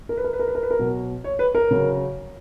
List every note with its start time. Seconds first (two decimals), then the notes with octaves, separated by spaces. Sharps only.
0.09 A#4
0.17 B4
0.24 A#4
0.33 B4
0.39 A#4
0.48 B4
0.55 A#4
0.63 B4
0.71 A#4
0.79 B2 F#3
1.24 C#5
1.39 B4
1.55 A#4
1.71 C#3 F#3